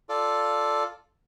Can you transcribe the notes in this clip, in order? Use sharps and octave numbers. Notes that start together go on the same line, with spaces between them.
F4 A4 D5